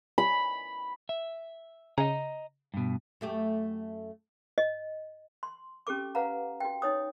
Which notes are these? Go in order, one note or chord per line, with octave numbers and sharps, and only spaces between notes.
B5
E5
C#3 D#5 A#5
G2 B2
F#2 A3 G4
D#5
C6
C#4 G4 A4 D6
B4 F5 F#5 A#5
F#4 G5
D#4 C#5 D#6